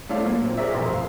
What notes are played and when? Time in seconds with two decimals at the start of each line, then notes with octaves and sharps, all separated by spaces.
0.09 A3 C#4 E4 C5 D5 F5
0.23 A#2 F#3 A#3
0.44 C4
0.57 G#4 A#4 C#5 D5 E5
0.73 F1 C2 B2 C4 G4 C6
0.91 C#2 F5